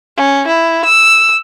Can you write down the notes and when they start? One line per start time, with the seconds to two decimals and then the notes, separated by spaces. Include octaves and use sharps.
0.17 C#4
0.47 E4
0.85 E6